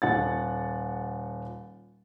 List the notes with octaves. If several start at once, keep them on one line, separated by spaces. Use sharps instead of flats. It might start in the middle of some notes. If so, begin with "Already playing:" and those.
D#1 F#5 A6